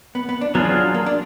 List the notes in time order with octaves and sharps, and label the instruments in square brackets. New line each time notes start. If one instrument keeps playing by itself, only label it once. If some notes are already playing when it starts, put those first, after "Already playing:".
[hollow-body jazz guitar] B3
B3
D4
[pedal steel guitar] F#3 D4 F4 G#4 [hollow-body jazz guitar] B3
[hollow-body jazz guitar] A#3
D4